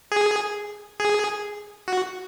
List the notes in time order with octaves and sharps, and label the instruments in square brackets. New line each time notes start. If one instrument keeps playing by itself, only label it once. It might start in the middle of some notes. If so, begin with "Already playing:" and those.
[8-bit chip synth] G#4
G#4
F#4